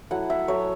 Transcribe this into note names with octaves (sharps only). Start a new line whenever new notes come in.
F#3 A3 E4 F#5
E5
F#3 A3 E4 C#5